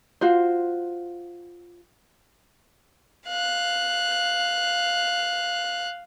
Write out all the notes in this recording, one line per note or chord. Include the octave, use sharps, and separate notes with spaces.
F4 F#4 C5
F5 F#6